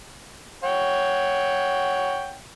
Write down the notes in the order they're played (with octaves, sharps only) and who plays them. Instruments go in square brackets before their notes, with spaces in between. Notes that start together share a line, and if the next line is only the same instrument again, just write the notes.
[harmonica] C#5 F#5 G5